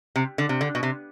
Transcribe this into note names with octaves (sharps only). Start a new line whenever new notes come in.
C3
D3
C3
D3
B2
C3